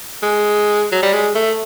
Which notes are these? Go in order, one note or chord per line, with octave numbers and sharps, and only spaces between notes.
G#3
F#3
G3
G#3
A3